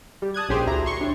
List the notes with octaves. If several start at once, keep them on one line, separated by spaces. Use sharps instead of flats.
G3
A5 D#6 F#6 G#6
A#1 C#4 G4 G#4 C5
D2 E4 A#5
C6 C#6
D4 E4 C#5